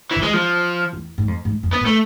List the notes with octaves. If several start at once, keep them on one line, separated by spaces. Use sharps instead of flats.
E3
D3
E3 G#3
F3
E2
G#2
F2
G#2
F2
B3
A2
A3